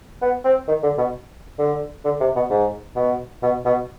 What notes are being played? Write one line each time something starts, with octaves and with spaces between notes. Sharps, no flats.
B3
C4
D#3
D3
B2
D3
D3
C3
B2
G#2
B2
B2
B2